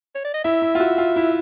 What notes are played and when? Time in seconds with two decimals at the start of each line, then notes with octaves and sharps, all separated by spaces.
0.15 C#5
0.24 D5
0.34 D#5
0.44 E4 E5
0.62 E4
0.75 F4
0.80 F#4
0.98 F4
1.16 E4